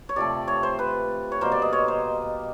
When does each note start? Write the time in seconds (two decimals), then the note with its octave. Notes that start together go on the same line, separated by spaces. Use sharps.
0.09 C#5
0.16 C3 F3 A3 D5
0.48 C#5
0.63 C5
0.79 B4
1.32 C#5
1.41 B2 G3 A#3 C5
1.52 D5
1.62 D#5
1.73 C#5
1.88 C5